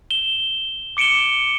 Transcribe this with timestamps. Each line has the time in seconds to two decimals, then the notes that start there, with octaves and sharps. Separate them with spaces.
0.11 E7 G7
0.97 D6 C#7 D7 E7 G7